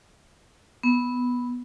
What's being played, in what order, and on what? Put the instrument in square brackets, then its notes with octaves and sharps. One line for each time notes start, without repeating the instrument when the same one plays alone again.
[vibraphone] B3